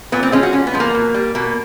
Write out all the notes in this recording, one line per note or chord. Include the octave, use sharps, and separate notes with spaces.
A#2 B3
C4
F3 G#3 C#4
F#4
A#2 C#4
B3
F3 G#3
A#3
B2
G3
B2 A#3